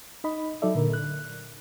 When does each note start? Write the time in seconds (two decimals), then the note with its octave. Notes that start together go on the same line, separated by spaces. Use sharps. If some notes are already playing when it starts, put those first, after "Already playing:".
0.24 D#4 D#5 B5
0.62 F#3 D#4 A4 D5 E5
0.75 A#2 D3 A#4
0.93 F#6